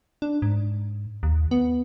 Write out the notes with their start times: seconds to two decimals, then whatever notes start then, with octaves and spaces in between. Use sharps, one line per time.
0.22 D4
0.42 G#2
1.23 D#2
1.51 B3